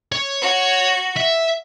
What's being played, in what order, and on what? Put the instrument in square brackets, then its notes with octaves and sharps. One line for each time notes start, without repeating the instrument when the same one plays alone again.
[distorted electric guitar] C#5
[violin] F#4
[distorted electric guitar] E5